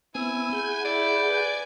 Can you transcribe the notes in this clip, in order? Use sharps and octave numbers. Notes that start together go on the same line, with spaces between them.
B3 C4 E4 G#5 E6
G#4 F#5 G6
E4 D5
B4 G#5